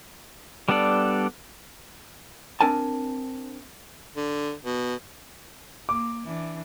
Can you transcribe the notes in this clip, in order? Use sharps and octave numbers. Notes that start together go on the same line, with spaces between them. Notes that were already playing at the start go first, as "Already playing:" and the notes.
G3 B3 D4 A4 D5
C4 D4 A#4 G#5 A5
D3
B2
A#3 D6
E3 D4